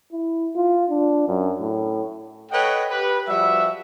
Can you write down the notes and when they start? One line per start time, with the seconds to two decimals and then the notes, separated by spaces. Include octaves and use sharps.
0.12 E4
0.56 F4
0.90 D4
1.28 F#2
1.61 A2
2.52 A4 B4 C#5 D#5 F#5 G5
2.90 G4 B4
3.28 F3 G3 F#4 E5